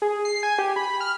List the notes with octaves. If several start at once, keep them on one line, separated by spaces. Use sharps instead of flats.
G#4
C7
G#5
G4
B5
F6